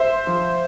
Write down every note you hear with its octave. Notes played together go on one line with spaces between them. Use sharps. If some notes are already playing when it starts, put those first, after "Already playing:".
Already playing: C5 E5
F3